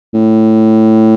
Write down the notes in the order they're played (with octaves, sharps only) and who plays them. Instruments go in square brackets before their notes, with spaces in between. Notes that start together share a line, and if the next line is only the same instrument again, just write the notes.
[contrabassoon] A2